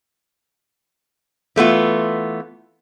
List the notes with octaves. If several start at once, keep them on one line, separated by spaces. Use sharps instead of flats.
E3 A3 B3 F4